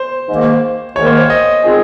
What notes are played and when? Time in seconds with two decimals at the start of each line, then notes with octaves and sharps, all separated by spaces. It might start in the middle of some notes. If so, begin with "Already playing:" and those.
Already playing: C5
0.29 G#2 D#3 A#3
0.96 G#2 D#3 A#3 C#5
1.06 C5
1.17 C#5
1.30 D#5
1.62 D#3 G#3 C4 F4 G#4